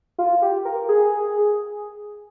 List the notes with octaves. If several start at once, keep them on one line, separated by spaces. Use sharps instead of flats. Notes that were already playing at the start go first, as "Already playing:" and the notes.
F4
G4
A#4
G#4